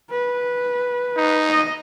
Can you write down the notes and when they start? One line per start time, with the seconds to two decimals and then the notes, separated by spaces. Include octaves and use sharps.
0.10 B4
1.17 D#4
1.49 D#5